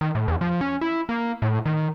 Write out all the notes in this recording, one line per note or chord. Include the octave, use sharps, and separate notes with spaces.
D#3
A2
E2
F3
C#4
E4
A#3
A2
D#3